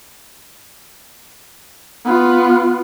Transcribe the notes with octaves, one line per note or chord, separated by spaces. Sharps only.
B3 F4